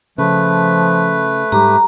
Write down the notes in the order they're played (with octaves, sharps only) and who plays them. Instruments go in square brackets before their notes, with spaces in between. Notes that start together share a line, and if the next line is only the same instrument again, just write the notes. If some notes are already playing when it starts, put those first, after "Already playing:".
[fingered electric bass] C#3 [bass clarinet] F3 [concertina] A3 B4
[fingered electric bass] G#2 G3 [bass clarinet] G4 [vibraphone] A#5